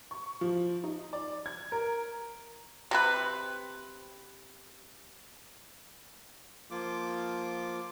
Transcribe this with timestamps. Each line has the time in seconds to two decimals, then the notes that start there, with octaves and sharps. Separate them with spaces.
0.11 C#6
0.41 F3
0.84 D#4
1.13 D5
1.46 G#6
1.72 A#4
2.91 C3 C4 B4
6.71 F3 A#3 F4 D6